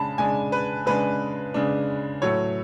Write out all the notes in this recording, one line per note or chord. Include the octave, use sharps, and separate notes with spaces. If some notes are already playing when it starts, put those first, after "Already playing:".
Already playing: C#3 G#3 D4 A5 B5
C#3 G#3 D4 G#5
B4
C#3 G#3 D4 B4
C#3 G#3 D4
A2 F#3 A3 C#5